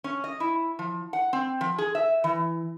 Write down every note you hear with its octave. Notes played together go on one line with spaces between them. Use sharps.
C#4
D#5
E4
F3
F#5
C4
F3
G#4
E5
E3